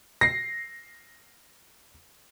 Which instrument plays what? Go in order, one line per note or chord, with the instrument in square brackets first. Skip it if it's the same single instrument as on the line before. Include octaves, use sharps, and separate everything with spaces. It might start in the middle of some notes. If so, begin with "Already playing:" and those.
[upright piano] A#6 C7